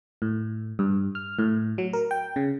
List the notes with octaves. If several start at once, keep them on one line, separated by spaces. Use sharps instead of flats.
A2
G2
F6
A2
F#3
A#4
G5
C#3